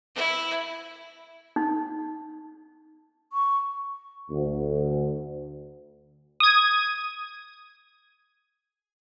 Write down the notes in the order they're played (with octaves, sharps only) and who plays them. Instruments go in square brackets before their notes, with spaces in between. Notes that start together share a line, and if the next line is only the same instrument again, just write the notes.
[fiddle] E4
[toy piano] D#4
[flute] C#6
[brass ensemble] D2
[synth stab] D#6 G#6